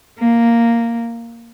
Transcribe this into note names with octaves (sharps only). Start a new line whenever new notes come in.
A#3